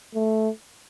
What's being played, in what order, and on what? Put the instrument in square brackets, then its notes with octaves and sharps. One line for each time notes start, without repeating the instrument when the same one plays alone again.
[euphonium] A3